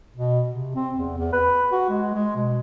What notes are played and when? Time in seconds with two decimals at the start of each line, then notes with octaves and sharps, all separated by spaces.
0.17 B2
0.50 C3
0.76 C4
0.95 E2
1.17 E2
1.33 B4
1.72 F#4
1.90 G#3
2.15 G#3
2.36 B2